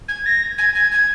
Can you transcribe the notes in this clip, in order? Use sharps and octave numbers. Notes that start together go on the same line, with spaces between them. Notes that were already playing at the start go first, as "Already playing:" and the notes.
G#6
A#6
G#6
G#6
G#6